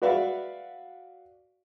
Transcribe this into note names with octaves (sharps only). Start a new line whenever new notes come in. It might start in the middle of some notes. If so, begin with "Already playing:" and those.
F#4 B4 D5 E5 F5